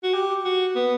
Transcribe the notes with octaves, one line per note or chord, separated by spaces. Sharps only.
F#4
G4
F#4
B3